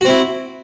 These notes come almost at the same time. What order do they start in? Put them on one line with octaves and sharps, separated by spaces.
F#4 C4 E4